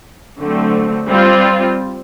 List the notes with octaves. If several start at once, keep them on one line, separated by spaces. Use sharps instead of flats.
D3 F#3 A3 C4
G3 C4 F4